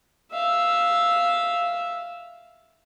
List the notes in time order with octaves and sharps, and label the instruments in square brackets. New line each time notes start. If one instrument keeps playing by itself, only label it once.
[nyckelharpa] E5 F5